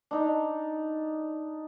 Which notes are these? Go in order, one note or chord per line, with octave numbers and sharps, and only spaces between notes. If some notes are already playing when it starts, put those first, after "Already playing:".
D4 D#4